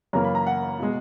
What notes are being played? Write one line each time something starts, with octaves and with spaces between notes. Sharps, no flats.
F#2 C#3 E3 A#3 A#5
B5
A#5
F#5
B2 G#3